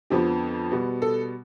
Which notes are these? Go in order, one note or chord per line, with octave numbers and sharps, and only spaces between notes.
F2 D3 F3 B3 G4
B2 G3 B3
A4